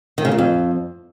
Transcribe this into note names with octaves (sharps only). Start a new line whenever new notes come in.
D#3
C#3
A#2
F2